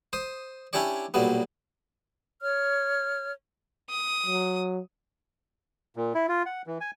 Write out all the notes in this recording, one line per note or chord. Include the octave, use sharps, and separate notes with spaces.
C5 D#6
C#4 D4 E4 G4 C#5 D5
B1 A#2 F#3 G3 B3
C#5 F6
D#6
F#3
A#2
E4
F4
F#5
E3
G#5